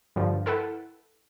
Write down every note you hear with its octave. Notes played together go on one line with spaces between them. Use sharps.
G2 D3 F3
E4 A4 B4 F#5 G5